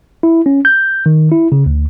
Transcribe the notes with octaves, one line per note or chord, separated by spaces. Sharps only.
E4
C#4
G6
D#3
E4
C#3
D2